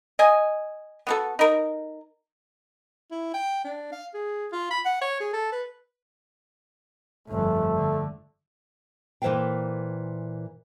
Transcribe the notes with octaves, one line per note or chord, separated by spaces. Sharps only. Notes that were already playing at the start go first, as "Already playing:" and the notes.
D#5 G#5
B3 F#4 A4
D#4 A#4
E4
G5
D4
F5
G#4
F4
B5
F#5
C#5
G#4
A4
B4
G1 F2 A3
D3
A#2 E3 C5 E5 F5 G5